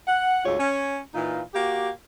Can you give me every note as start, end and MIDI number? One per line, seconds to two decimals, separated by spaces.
0.07 0.41 78
0.44 0.58 38
0.44 0.58 44
0.44 0.58 65
0.44 0.58 73
0.58 1.00 61
1.14 1.41 46
1.14 1.41 52
1.14 1.41 63
1.14 1.41 65
1.54 1.89 58
1.54 1.89 66
1.54 1.89 67